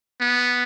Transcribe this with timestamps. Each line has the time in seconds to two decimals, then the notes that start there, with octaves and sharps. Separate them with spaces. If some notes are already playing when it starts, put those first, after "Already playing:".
0.21 B3